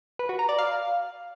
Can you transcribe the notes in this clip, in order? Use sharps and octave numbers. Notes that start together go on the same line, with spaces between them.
B4
F#4
A#5
D5
F5